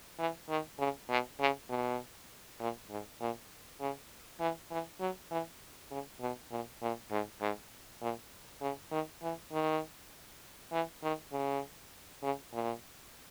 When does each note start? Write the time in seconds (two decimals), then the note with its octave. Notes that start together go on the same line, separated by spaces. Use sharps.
0.19 E3
0.49 D#3
0.79 C#3
1.09 B2
1.40 C#3
1.69 B2
2.60 A#2
2.90 G#2
3.21 A#2
3.80 C#3
4.40 E3
4.71 E3
5.00 F#3
5.31 E3
5.91 C#3
6.21 B2
6.51 A#2
6.82 A#2
7.11 G#2
7.41 G#2
8.02 A#2
8.61 C#3
8.91 D#3
9.23 E3
9.52 D#3
10.72 E3
11.03 D#3
11.32 C#3
12.22 C#3
12.53 A#2